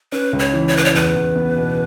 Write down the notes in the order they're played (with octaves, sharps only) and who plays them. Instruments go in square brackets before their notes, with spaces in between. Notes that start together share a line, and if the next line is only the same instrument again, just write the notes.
[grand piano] C#4 [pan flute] B4
[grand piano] C#2
[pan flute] C#5
[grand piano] E3
[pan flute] C#5
[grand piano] C#3 [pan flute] B4
[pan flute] C#5
[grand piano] E2 [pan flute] B4
[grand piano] E2
B3
B2